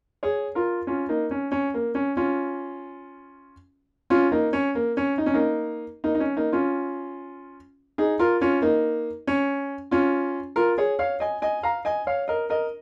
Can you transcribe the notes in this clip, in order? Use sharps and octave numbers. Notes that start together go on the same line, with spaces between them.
G#4 C#5
F4 A#4
C#4 F4
A#3 D#4
C#4
C#4
A#3
C#4
C#4 F4
C#4 F4
A#3 D#4
C#4
A#3
C#4
D#4
C#4
A#3 D#4
A#3 D#4
D#4
C#4
A#3 D#4
C#4 F4
D#4 G#4
F4 A#4
C#4 F4
A#3 D#4
C#4
C#4 F4
F4 A#4
G#4 C#5
C#5 F5
D#5 G#5
D#5 G#5
F5 A#5
D#5 G#5
C#5 F5
A#4 D#5
A#4 D#5